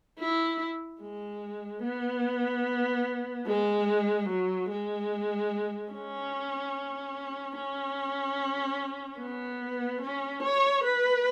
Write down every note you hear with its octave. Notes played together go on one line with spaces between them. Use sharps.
E4
G#3
B3
G#3
F#3
G#3
C#4
C#4
B3
C#4
C#5
B4